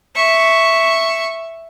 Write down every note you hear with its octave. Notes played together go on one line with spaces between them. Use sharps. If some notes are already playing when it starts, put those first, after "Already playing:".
E5 C#6